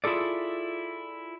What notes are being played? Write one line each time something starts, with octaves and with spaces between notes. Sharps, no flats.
E4 F4 G#4 A4 D5